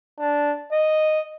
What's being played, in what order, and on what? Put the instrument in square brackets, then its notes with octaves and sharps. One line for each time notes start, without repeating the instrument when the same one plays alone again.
[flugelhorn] D4
D#5